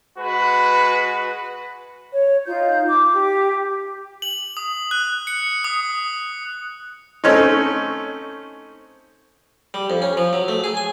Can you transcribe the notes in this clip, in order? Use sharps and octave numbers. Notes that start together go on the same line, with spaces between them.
G#3 F#4 B4
C#5
D#4 F4 G6
D6
G4
F#7
D#6
F#6
C#7
D#6
A3 C4 C#4 D#4
G3
F2
C#4
F3
F#3
A3
G#4
G#5